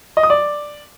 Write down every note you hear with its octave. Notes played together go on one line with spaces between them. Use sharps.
D#5
D#6
D5